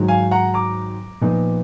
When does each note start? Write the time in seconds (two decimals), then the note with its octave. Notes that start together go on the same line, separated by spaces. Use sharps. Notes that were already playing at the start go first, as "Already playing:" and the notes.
Already playing: G#2 D#3 F#3
0.08 F5 G#5
0.31 F#5 A#5
0.54 A#5 D6
1.22 A#2 F3 B3 D#4